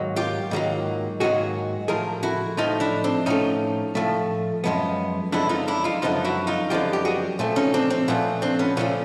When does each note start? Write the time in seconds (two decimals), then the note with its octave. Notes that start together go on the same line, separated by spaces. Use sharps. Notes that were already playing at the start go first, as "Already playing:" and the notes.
Already playing: G#2 D#3 F#3 A#3
0.16 F4 G4
0.51 G#2 D#3 F#3 A#3
1.20 G#2 D#3 F#3 A#3 F#4 G#4
1.88 A2 F3 A3 G#4 A#4
2.23 E4 F#4
2.57 A2 F3 A3 D#4 F4
2.80 D4 E4
3.04 C4 D4
3.26 A2 F3 A3 C#4 D#4
3.95 A2 F3 A3
4.64 F#2 D3 F3 G#3 B3
5.32 F#2 D3 F3 G#3 B3 D4 E4
5.49 D#4 F4
5.68 D4 E4
5.84 D#4 F4
6.02 F#2 D3 F3 G#3 B3 D#4 F4
6.25 E4 F#4
6.47 D#4 F4
6.70 F#2 D3 F3 G#3 B3 F4 G4
6.93 G4
7.05 F#4 G#4
7.39 A#2 F3 A3
7.56 C#4 D#4
7.74 C4 D4
7.90 C4
8.08 A#2 F3 A3 B3
8.42 C4 D4
8.59 B3 C#4
8.77 A#2 F3 A3 B3 C#4